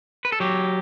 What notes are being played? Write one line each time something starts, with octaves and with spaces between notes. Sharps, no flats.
B4
A4
F#3 G4